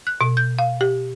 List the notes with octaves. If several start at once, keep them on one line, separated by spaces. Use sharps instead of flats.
F#6
B2
G6
F5
G4